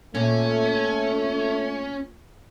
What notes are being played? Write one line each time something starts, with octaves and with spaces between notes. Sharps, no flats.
A#2 A3 C#4